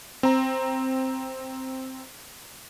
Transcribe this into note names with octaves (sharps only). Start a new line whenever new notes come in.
C4 A#5